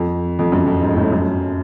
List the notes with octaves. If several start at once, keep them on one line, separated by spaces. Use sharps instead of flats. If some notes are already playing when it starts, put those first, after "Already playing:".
Already playing: F2
F2
F#2
F2
G#2
A2
F#2